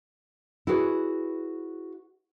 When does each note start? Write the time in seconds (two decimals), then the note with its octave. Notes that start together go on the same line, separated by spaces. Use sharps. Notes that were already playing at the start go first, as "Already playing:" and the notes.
0.67 E4 F#4 G#4 B4 C#5